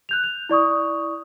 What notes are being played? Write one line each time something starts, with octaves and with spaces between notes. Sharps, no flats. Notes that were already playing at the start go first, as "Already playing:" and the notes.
F#6 G6 F7
F7
E4 D5 C#6 D#6